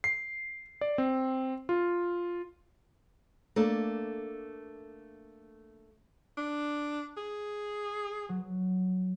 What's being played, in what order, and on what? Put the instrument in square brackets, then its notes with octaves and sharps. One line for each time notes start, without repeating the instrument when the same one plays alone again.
[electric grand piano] C7
D5
C4
F4
[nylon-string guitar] A3 A#3 D4
[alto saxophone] D4
G#4
[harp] F#3